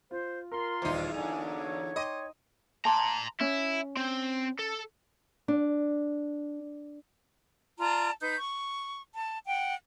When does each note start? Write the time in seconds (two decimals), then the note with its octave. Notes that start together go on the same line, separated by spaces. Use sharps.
0.11 F4 C5
0.52 F4 A#4 A#5 C6
0.82 D#1 E2 D#4 C5
1.14 D3 F#3 A#3 G#5 F7
1.57 C#5
1.96 D#5 G5 C6 D6
2.85 A5 A#5 C6
3.41 C#4 E4
3.97 C4
4.59 A4
5.48 D4
7.79 F4 D5 A5 A#5
8.21 D#4 B4 G6
8.37 C#6
9.16 A5
9.46 F#5 G5